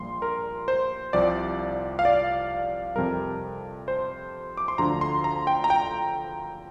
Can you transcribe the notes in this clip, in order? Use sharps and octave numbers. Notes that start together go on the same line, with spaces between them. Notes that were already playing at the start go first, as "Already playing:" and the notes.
Already playing: A#1 A#2 G3 C6
A#4
C5
C2 C3 F3 D5
F5
D5
F2 C3 G3 A#4
C5
D6
C6
D2 D3 F3 A#5
C6
A#5
G5
A#5
G5